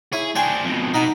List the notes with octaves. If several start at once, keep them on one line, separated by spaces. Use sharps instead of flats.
E4 G#4 C#5
D4 C5 G5 G#5
F2 B2
B2 D#4 F#5